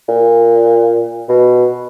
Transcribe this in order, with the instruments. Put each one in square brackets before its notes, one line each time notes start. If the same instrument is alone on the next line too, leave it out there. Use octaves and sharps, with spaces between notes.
[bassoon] A#2
B2